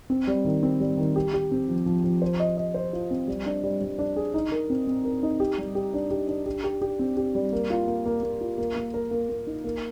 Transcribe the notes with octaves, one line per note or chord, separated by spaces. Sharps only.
C4
G3
D#3
C4
G3
D#3
G4
G4
C4
F3
F3
F3
C5
D#5
D#5
C5
F4
C4
G3
D4
G3
G3
D4
G#4
D#4
A#4
C4
C4
A#4
D#4
G4
G3
G4
D4
G4
D4
G4
G4
G4
C4
G4
G3
A#3
F4
A#3
A#3
A#3
F4
A#3
A#3
A#4
A#3
A#3
D#4
A#3